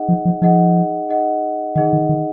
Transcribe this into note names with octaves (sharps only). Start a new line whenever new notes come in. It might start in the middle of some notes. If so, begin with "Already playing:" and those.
Already playing: D#4 G#4 D#5 F#5
F3
F3
F3 D#4 G#4 D#5 F#5
D#4 G#4 D#5 F#5
D#3 D#4 G#4 D#5 F#5
D#3
D#3